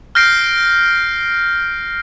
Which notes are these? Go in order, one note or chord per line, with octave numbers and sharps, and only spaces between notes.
F6 G6 A#6 C7 D7